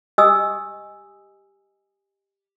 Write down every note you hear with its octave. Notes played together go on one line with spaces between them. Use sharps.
G4 D#5 G#5 D#6 E6